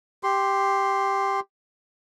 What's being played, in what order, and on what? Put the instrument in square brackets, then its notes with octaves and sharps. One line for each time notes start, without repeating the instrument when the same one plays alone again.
[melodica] G4 C6